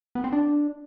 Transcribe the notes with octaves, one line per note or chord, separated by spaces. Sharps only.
B3
C4
D4